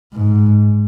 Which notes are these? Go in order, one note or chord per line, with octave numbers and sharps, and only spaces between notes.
G#2